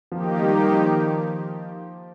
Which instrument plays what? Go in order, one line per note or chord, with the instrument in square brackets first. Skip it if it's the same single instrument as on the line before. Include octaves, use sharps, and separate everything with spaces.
[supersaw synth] D#3 A#3 D#4 G4 [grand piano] F3
[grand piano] G3
F3